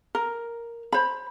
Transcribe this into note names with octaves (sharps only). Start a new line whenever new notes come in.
A#4
C5 B5